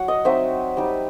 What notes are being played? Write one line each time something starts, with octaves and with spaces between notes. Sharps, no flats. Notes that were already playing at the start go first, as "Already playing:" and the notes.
Already playing: F#3 F#5
D#5
F#3 C4 D#4 E5
G3 D#4